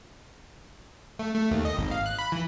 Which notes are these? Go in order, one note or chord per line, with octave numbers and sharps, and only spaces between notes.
A3
A3
D#2
D#5
G#1
F5
F#6
B5
E3